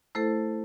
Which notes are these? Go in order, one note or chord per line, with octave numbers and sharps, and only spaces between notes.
A3 E4 A4 C5